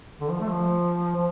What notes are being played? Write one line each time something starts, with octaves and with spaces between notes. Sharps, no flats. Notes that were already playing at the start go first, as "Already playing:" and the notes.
D3
F3
A3
F3
F3